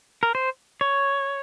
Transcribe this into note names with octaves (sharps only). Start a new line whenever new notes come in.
A#4
C5
C#5